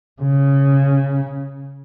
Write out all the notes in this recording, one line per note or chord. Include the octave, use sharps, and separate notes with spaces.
C#3